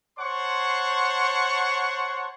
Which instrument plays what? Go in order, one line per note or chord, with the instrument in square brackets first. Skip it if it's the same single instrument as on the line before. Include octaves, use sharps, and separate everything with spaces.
[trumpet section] C5 C#5 F#5 A5 C6 C#6